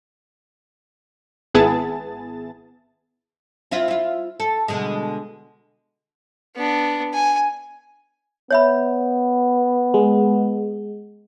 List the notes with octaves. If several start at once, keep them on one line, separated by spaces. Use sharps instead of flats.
G#1 B3 E4 G#4 A5 A6
C4 E4 F4
E4 F4
A4
B2 D3 G#3
B3 D4
G#5
B3 C#5 E5 B5
G#3